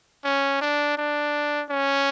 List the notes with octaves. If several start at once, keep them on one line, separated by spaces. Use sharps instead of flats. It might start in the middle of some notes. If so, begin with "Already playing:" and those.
C#4
D4
D4
C#4